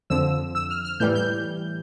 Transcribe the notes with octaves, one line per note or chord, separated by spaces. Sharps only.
F2 D3 F3 E6
E6
F6
F6
A2 E3 G3 G6
G6